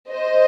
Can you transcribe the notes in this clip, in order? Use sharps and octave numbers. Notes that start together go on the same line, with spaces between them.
C5 D#5